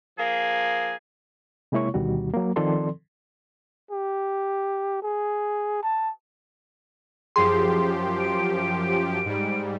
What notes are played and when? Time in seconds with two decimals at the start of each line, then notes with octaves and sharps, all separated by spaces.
0.18 F3 A#3 G#4
1.72 C3 G#3 A#3 E4 C#5 C#6
1.94 D2 B2 D#3 G3 F#4
2.33 F#3 A#3
2.56 D#3 F3 C4 A4 D5 C6
3.91 G4
5.02 G#4
5.83 A5
7.36 F#2 F3 G4 G#4 C6
8.20 D7
9.25 G#2 G3